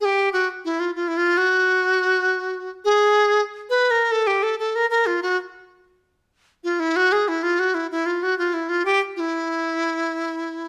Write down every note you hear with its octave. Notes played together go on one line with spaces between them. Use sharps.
G#4
G4
F#4
E4
F4
F4
E4
F4
F#4
G#4
B4
A#4
A4
G4
A4
A4
A#4
A#4
F4
F#4
F4
E4
F#4
G#4
E4
F4
F#4
E4
E4
F4
F#4
F4
E4
F4
G4
F4
E4